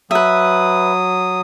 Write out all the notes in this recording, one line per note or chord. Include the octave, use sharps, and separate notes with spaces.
F#3 B4 E5 D#6